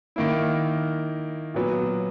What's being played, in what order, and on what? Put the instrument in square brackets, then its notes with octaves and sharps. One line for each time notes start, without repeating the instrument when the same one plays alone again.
[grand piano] D#3 A#3 E4
A#2 F#3 B3